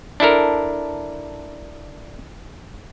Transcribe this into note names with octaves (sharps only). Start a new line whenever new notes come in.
D4 E4 A4 A#4